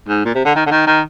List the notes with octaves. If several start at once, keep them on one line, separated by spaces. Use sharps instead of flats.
G#2
A#2
C3
D3
D#3
D3
D#3
D#3